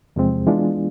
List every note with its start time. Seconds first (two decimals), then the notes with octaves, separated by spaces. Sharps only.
0.16 E2 C3 F3 G#3 C4
0.47 E3 G#3 B3 D4 F4